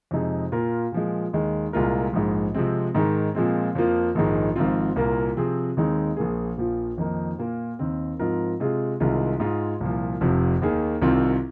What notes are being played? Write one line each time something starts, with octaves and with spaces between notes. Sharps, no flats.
F2 C3 G#3 D#4 G#4
A#2 A#3 F4 A#4
A#2 F3 G#3
D#2 D#3 G#3
C2 A#2 G#3 F4 A#4
A#1 G#2 G#3
C3 F3 G#3 C4
G#2 D#3 G#3
A#2 F3 G#3 C4
F2 F3 A#3 F4
A#1 G#2 D#3 G#3
G#1 G#2 F3 C4 F4
C2 A#2 A#3 F4 A#4
C3 F3 C4 G#4
D#2 D#3 G#3 C4 D#4
A#1 A#2 A#3 G#4
A#1 A#2 F3
F2 D#3 A#3 D#4
A#2 A#3 F4 A#4
D#2 D#3 C4
G#2 F3 C4 F4 A#4
C3 G#3 F4 G#4
C2 C3 D#3 G#3 F4
G#2 G#3 F4 G#4
C2 A#2 F3
F1 F2 C3 F3
D#2 D#3 A#3 G#4
C2 C3 D#3 C4 F4